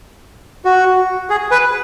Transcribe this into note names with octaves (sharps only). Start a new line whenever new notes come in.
F#4
G#4
B4